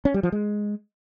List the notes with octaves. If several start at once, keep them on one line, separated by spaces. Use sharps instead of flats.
C#4
G3
F3
G#3